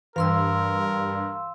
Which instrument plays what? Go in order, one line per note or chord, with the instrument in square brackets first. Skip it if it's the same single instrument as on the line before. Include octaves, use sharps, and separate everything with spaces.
[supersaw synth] G2 [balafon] E3 [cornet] A#4 [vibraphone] F5 C6 E6